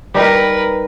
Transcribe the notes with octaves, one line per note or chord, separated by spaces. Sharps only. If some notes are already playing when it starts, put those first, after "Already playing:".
G3 D#4 A#4 B4